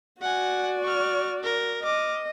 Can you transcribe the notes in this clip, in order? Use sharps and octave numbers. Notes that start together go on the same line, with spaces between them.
F#4 D5 F#5 G#5
C#6 F6
A#4
D#5 D6 F6